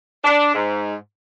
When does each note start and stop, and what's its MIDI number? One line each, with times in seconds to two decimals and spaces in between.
0.24 0.51 62
0.54 0.93 44